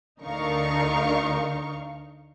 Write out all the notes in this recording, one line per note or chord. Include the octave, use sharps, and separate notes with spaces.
D2 D3 D#4 A#4 F5 C#6